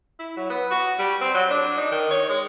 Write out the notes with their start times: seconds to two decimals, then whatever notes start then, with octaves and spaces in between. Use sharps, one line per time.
0.19 E4
0.37 F#3
0.50 B3
0.71 F#4
0.99 G3
1.21 C4
1.35 F#3
1.51 D4
1.77 D#4
1.91 D#3
2.11 C#5
2.29 G#3